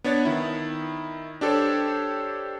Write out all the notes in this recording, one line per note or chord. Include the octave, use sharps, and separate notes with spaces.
B3 D4 C#5 A6
D#3 E4
D4 G4 A4 C5 C#5